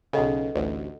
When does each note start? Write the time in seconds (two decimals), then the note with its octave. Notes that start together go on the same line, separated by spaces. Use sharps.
0.13 B1 C#3 A4 D#5 F#5
0.56 A1 D2